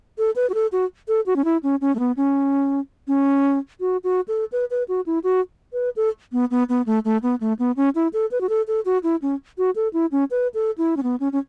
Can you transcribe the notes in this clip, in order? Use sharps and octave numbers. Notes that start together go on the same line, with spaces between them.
A4
B4
F#4
A4
F#4
A4
F#4
C#4
E4
C#4
C#4
A3
B3
C#4
C#4
F#4
F#4
A4
B4
B4
F#4
E4
F#4
B4
A4
B3
B3
B3
A3
A3
B3
A3
B3
C#4
E4
A4
B4
F#4
A4
A4
F#4
E4
C#4
F#4
A4
E4
C#4
B4
A4
E4
C#4
B3
C#4
C#4